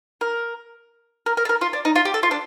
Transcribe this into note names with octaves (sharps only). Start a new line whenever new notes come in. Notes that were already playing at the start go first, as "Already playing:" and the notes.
A#4
A#4
A#4
A4
A#4
F4
D4
D#4
F4
G4
A4
F4
D4